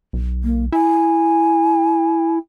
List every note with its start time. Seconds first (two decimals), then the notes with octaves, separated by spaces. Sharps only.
0.13 B1
0.44 A#3
0.72 E4 G#5